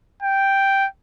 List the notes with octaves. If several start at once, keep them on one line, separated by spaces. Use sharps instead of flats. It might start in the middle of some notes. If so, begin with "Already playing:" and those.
G5